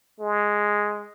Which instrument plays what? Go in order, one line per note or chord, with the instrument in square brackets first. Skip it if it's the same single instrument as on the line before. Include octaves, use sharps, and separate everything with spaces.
[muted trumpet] G#3